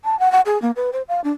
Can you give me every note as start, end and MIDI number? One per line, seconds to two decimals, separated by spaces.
0.05 0.18 81
0.19 0.31 78
0.32 0.41 78
0.46 0.60 68
0.62 0.71 58
0.76 0.90 71
0.93 1.02 72
1.08 1.21 77
1.24 1.32 62